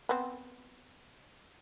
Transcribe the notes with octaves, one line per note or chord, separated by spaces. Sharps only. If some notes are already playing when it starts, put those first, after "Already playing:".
B3 C4